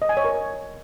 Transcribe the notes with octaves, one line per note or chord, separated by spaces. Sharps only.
D#5
G#5
C#5
A#4